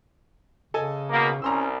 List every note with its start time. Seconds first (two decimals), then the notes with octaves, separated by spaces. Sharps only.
0.74 C#3 A4 D#5 G#5
1.11 B2 A#3
1.42 C2 C#4 A#5 C6 E6